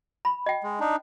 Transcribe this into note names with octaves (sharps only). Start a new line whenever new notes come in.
B5
D#5 G5
G#3
D4 D#4